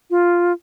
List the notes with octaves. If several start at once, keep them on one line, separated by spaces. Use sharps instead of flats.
F4